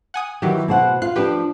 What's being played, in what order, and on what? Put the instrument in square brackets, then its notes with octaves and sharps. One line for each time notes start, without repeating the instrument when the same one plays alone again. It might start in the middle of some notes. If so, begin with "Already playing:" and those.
[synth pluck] F#5 G#5 D#6
[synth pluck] D#3 F#3 G4 [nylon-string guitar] E3
[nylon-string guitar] B2 C5 F#5
[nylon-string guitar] F4 [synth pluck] F#6 C7
[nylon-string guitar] F3 D4 [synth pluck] G4 B4